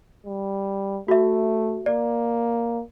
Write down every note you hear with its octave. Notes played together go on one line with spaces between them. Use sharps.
G3
A3 F#4 E5
A#3 D5